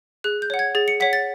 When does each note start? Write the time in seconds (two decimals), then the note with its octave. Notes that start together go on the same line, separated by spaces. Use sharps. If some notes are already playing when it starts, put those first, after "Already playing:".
0.24 G#4 F#6
0.42 G6
0.50 C#5 F#5
0.59 G#6
0.75 G#4 A6
0.88 C#7
1.00 C#5 F#5 B6
1.13 A6